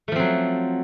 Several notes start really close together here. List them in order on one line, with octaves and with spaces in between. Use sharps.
A3 F3 C4 F#3